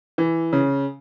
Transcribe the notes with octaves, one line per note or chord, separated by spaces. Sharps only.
E3
C#3